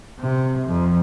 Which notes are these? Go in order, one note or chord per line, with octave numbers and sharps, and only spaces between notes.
C3
F2